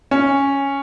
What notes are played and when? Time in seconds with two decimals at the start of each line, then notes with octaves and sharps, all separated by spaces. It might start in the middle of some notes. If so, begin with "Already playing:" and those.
0.11 C#4 G#5
0.41 G#5